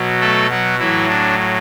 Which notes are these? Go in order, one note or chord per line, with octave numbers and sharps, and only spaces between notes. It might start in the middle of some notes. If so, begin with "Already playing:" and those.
Already playing: B2 F#3
A3 A4
F#3 F#4
A2 E3 F#3 E4
D4